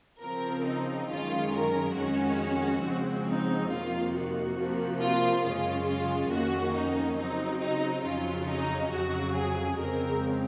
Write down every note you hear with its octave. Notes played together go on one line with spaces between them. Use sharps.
C#3 F3 C4 A#4
D#4
F#2 D#3 G#3 C#4 F4
A#4
F2 D#3 G#3 C#4 F#4
C#3 F3 G#3 C4
D#4
F2 C3 D#3 A#3 F4
F#4
C3 F3 A#3
F4
F#2 C#3 G#3 C#4 F4
F4
F2 D#3 A#3 C#4 F#4
D#4
C#3 F#3 C4 D#4
D#4
F2 C#3 F#3 C#4 F4
D#4
F2 C#3 F#3 F#4
G#4
F2 C#3 G#3 C4 A#4